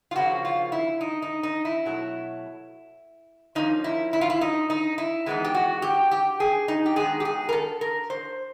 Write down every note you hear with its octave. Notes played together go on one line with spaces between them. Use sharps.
F4
C#3 F3 A#3 C#4 F#4
F4
E4
D#4
D#4
D#4
E4
B2 F#3 A3
F3 A#3 C#4 D#4
E4
E4
F4
E4
D#4
D#4
E4
E3 G#3 B3 D#4
G4
F#4
G4
G4
G#4
D#4
G4
D#3 G#3 B3 D#4 G#4
G4
G#4
A#4
A4
A#4
C5